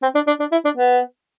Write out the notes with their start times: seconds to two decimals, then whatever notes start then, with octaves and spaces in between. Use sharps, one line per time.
0.02 C4
0.15 D4
0.27 D4
0.40 D4
0.52 E4
0.65 D4
0.77 B3